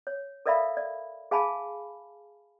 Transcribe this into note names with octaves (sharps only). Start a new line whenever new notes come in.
C#5
A4 A#4 D5 E5 F5 B5
D5
G#4 F5 G#5 A5 B5